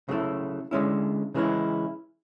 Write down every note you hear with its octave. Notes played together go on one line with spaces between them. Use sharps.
C#3 F#3 A3 E4
D3 G#3 C#4 E4
C#3 E3 G#3 C#4 E4